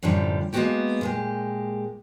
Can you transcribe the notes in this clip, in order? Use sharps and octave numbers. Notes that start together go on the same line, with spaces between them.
F#2 A2 D3 F3 G3
G#3 A#3 B3 C#4 F#4 G4
A#2 G#3 G4